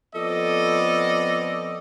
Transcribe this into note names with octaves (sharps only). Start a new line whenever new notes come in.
F3 B3 C4 A4 D5 D#5